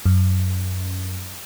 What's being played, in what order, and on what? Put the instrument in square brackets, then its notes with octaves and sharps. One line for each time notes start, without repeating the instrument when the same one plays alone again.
[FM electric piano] F#2